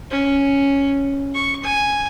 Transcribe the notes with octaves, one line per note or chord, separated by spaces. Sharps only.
C#4
C#6
G#5